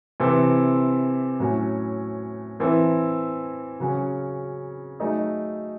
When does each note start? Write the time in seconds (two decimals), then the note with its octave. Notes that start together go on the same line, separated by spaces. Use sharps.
0.20 C3 E3 C4 E4 A4
1.40 A2 F#3 A3 C#4 E4
2.60 E3 C4 E4 A4
3.80 C#3 F#3 C#4
5.00 F#3 A3 D#4 G#4